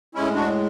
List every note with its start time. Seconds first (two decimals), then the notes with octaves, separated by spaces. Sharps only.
0.15 A2 G#3 C#4 E4
0.35 D4 F#4